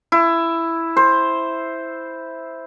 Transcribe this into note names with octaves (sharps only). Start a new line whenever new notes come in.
E4
C5